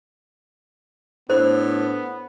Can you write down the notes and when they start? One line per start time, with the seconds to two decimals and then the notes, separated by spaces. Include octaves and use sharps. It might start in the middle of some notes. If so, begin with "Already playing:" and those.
1.30 A2 B3 D4 C5